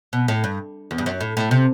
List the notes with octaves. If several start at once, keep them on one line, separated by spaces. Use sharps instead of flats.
B2
A2
G2
E2
G2
F#2
A2
A2
C3